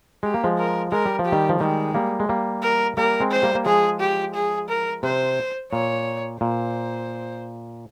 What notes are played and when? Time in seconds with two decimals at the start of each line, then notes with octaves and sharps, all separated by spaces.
0.23 G#3 G4
0.34 A#3
0.44 F3 G#3
0.58 A#4
0.92 G#3 A#4
1.06 G3
1.19 F3
1.26 G4
1.32 D#3 G3
1.49 F3
1.60 D#3 G3 G#3
1.94 G3 A#3
2.20 G#3
2.29 G3 A#3
2.63 A#4
2.97 G3 A#3 A#4
3.20 G#3 C4
3.32 C5
3.43 G3 A#3
3.55 A#3
3.66 F3 G#3 G#4
4.00 G4
4.35 G#4
4.69 A#4
5.03 C3 C5
5.72 A#2 C#5
6.41 A#2 C5